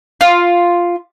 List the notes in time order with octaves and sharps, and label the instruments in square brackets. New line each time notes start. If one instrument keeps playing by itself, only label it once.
[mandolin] F4